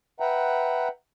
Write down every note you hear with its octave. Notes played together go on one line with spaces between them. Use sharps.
B4 E5 F#5 G5 A#5